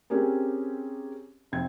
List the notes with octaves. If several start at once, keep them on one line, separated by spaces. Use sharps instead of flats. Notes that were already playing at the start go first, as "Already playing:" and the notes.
C4 C#4 G4 G#4 A#4
F1 C4 G#6